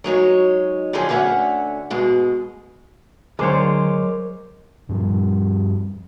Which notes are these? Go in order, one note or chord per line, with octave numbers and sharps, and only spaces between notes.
F#3 G#3 D#4 C#5
D3 F3 F#3 D#4 G#4
D2 D3 C#4 E5 F#5
G#2 B2 G#3
D2 D3 F#3 G#3 A#4 C5 C#5 D6
G2 F3 G3